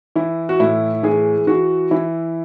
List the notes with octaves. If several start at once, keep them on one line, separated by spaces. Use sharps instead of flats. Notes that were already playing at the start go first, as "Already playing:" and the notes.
E3 E4
F#4
A2 E4
E3 G#4
E3 F#4
E3 E4